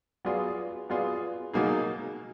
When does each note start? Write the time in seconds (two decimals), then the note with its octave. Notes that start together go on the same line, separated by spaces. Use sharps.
0.25 F#3 B3 F4 G#4 D5
0.89 F#3 B3 F4 G#4 D5
1.53 B2 F#3 A#3 D#4 G#4